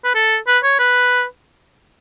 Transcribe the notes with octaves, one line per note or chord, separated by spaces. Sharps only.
B4
A4
B4
C#5
B4